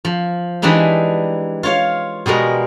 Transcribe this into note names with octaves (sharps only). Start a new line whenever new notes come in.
F3
E3 G3 G#3 D4 D#4 E5
F4 C#5 F5
B2 G3 G#3 A#4